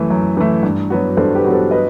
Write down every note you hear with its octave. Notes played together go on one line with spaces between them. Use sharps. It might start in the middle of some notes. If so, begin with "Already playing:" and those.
Already playing: F#2 E3 A3
F#2
E3 A3
G2
F#3 B3 F#4
G2 A4 C5
G4 B4
F#3 B3 F#4
A4 C5
B4 D#5